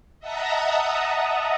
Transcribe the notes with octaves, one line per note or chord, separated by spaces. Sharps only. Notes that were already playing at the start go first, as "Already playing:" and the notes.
D#5 E5 F#5 A5 A#5 D#6